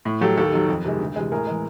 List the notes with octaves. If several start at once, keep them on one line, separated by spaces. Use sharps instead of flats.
A2
F#3 G4 A4
D#2 G4 A4
D#3 F#3
F2
C3 D#3 G#3
D2
C3 E3 G#3
A2 G#4 A#4
E3 G#3